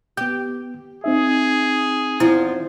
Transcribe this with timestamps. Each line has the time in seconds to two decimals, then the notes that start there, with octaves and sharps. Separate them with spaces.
0.17 B3 G4 G6
1.04 C4 D#4 G#4 E5
2.20 E2 F3 E4